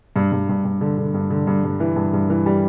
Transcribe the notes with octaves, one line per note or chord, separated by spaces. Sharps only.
G2
G2
G2
G2
D3
D3
G2
D3
G2
G2
E3
G2
G2
E3
G3